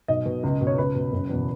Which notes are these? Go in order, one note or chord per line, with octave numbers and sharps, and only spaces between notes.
B1 D#5
B2
C#2
B2
C#5
C#2 B4
B2
F#1
E2 B2